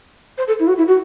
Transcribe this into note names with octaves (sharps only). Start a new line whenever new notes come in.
C5
A4
E4
F#4
E4
F#4